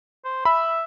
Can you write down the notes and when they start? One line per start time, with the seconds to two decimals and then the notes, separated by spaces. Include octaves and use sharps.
0.25 C5
0.45 E5 B5